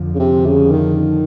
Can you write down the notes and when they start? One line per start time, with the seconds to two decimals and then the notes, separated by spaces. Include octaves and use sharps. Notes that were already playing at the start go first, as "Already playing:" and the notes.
Already playing: F2 D3 F3
0.15 C#3
0.19 C3
0.46 C#3
0.71 D#3